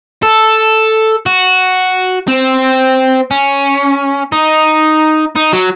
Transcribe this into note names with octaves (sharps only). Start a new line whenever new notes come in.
A4
F#4
C4
C#4
D#4
D#4
F#3